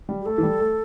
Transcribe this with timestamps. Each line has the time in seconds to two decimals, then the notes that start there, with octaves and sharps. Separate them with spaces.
0.09 G3
0.21 G4
0.26 A3 A4
0.38 E3
0.43 G3
0.60 A3